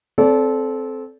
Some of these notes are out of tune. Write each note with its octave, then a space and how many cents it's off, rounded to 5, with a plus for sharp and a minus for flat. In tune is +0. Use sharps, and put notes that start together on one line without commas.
C4 +0 A4 -20 D5 -35